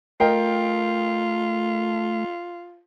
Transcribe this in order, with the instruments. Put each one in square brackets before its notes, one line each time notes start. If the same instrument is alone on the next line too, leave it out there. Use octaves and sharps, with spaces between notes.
[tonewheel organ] A3 [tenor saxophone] F4 [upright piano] A#4 D#5 G5